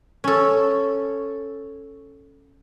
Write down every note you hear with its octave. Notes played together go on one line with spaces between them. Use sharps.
C#4 A4